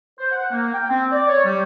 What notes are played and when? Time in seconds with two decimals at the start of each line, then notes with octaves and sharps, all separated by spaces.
0.19 C5
0.32 F#5
0.51 A#3
0.73 G5
0.89 C4
1.12 D5
1.29 C#5
1.44 G3